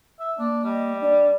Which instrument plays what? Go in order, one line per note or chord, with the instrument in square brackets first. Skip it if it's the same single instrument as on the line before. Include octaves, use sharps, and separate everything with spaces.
[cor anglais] E5
[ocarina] A#3 [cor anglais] D4
[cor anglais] G3 [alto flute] D#5
[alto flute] D4 [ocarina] D5